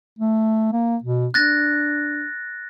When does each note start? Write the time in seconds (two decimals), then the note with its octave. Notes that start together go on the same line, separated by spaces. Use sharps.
0.19 A3
0.72 A#3
1.03 B2
1.34 D4 F#6 A6 A#6